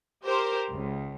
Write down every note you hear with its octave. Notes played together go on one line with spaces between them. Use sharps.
G4 A#4 C5
C#2